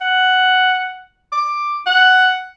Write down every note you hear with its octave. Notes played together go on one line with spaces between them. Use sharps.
F#5
D6
F#5